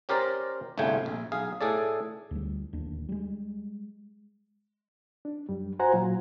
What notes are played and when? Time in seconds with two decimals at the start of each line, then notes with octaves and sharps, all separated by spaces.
0.09 C#4 G4 A#4 C5 D5 A#5
0.78 G1 C2 C#3 A3 G5 G#5
1.06 A#1
1.32 B1 G#4 F5
1.61 A2 G#4 A4 D5
2.31 D2 G3
2.73 D1 D#2 D4
3.09 G3 G#3
5.25 D4
5.49 F#2 G3
5.79 F#4 C5 F#5 G#5 A#5
5.93 A#2 F#3 F4